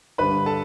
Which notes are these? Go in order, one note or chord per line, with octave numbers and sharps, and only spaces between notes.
G2 D3 G3 B4 B5
A4 A5